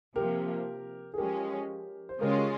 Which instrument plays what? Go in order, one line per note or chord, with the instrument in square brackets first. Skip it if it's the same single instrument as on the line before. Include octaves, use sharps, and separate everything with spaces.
[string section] C3 F3 A#3 [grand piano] G4 A#4
[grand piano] G#4
[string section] F3 G#3 C#4 [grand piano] G4 A#4
[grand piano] C5
[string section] C#3 G#3 C#4 F4 [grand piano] G4 A#4